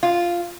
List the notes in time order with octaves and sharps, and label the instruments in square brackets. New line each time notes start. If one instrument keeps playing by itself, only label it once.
[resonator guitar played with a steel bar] F4